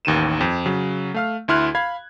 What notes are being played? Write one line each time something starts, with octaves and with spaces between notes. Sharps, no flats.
A1 D#2 D#3 D#7 E7
F2
C#3 F#3
A3 F5 F6
D2 E4 C6 F6 F#6
F5 B5 G#6